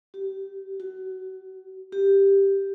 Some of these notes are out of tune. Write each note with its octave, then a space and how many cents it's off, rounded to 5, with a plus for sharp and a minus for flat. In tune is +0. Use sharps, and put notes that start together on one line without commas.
G4 -20
F#4 +25
G4 +5